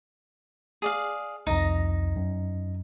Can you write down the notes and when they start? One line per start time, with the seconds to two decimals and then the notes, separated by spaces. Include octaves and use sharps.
0.82 G#4 D5 F5
1.47 C2 F2 D#4 A#5
2.16 F#2